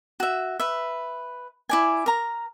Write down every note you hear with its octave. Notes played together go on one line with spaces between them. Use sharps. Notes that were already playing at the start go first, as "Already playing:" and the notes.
F#4 E5
B4 E5
E4 D5 G#5
A#4 A#5